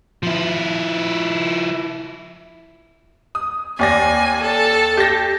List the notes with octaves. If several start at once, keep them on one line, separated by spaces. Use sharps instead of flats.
F3 E4
D#6
D#2 D5 G#5 A#6
A4
G4 A#6